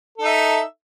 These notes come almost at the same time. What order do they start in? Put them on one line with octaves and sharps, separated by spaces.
A4 D#4 E5